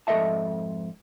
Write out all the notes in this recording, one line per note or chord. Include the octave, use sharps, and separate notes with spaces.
F2 G#2 A4 D#5 E5 A5